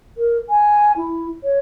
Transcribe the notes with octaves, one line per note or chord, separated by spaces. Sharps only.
A#4
G#5
E4
C#5